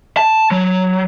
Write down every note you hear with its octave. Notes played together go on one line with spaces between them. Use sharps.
A5
F#3